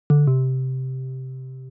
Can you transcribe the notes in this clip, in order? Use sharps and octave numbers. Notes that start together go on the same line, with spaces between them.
D3
C3